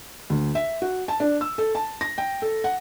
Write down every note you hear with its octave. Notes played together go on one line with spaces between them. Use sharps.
D2
E5
F#4
A5
D4
E6
A4
A5
A#6
G5
A4
F#5